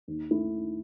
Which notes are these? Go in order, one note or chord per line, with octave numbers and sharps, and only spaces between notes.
D#2
D#3 A3 E4